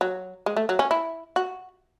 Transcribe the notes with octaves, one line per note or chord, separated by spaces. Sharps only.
F#3
G#3
A3
F#3
C#4
E4
F#4